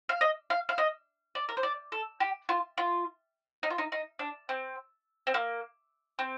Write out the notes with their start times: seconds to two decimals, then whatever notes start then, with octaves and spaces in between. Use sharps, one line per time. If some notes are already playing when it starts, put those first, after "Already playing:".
0.09 F5
0.21 D#5
0.50 F5
0.69 F5
0.78 D#5
1.35 D5
1.49 A#4
1.57 C5
1.63 D5
1.92 A4
2.20 G4
2.49 F4
2.78 F4
3.63 D#4
3.70 F4
3.78 D#4
3.92 D#4
4.19 D4
4.49 C4
5.27 C4
5.34 A#3
6.19 C4